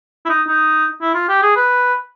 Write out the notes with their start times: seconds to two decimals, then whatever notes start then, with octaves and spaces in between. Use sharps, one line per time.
0.26 E4
0.29 D#4
0.47 D#4
1.01 E4
1.15 F4
1.29 G4
1.42 G#4
1.56 B4